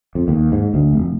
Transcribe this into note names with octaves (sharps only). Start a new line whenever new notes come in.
F2
D#2
G#2
D2
F1